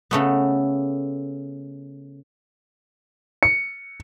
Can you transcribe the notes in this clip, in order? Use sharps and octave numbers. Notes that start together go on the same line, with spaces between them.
C#3 A3 B3
C#7